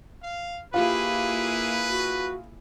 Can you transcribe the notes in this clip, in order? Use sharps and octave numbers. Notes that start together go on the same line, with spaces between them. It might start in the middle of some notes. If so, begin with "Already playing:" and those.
F5
A#3 E4 F4 G4 G#4 B4
F#4